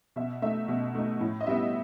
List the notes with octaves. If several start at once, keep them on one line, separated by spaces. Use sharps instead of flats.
B2 E5
A3 D#4 E5
B2
A3 D#4
A2
D#5
G3 B3 E5